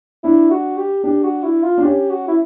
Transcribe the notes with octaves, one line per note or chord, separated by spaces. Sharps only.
D4 E4
F#4
G4
D4 G4
F#4
E4
F4
D4
C#4 G4
F#4
E4